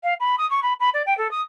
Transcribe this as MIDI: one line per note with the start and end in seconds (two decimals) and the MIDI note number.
0.03 0.14 77
0.20 0.35 83
0.38 0.48 87
0.50 0.60 85
0.62 0.73 83
0.80 0.89 83
0.93 1.02 74
1.06 1.16 79
1.17 1.30 69
1.31 1.41 87